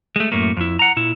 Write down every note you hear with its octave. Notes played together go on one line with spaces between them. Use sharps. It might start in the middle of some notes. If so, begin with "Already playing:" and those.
G#3 A3
F#2 A2 A3 A#3
F2 E4
F#5 A#5
A#2 E4